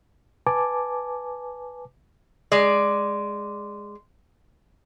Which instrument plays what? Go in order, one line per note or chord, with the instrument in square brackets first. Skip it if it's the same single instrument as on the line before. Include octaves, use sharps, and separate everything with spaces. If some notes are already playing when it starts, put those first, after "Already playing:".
[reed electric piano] B4 G#5 A5 D6
[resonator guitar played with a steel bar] G#3 D5